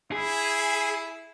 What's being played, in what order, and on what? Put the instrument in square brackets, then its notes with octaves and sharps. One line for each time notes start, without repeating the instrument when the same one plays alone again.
[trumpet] E4 [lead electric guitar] G#4